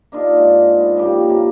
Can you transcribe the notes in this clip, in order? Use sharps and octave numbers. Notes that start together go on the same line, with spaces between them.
A#3 D4 D#4 F4
G#2
B3
C#3 F3 A#3 G4
C3 A#3